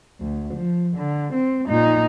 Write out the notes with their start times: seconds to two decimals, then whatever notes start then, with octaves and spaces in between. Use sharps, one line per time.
0.21 D2
0.54 F3
0.97 D3
1.33 C4
1.69 A#2 D#4